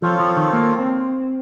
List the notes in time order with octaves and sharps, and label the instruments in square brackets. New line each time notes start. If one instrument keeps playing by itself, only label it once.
[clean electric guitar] F3 [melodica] C4 F4 A4 C#5
[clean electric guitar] F3
D#3
A#3
C4